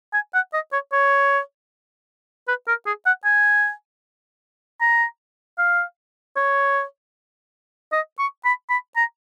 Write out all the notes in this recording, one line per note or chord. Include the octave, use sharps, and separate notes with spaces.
G#5
F#5
D#5
C#5
C#5
B4
A#4
G#4
F#5
G#5
A#5
F5
C#5
D#5
C#6
B5
B5
A#5